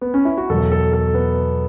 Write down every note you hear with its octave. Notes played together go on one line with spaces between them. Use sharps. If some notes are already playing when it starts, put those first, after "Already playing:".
B3
C#4
E4
F#4
E2 B2 F#3 A4
A4
A4
B3